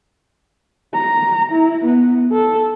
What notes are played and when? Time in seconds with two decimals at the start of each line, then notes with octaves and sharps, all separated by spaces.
0.95 A#5
1.52 E4
1.84 B3
2.32 A4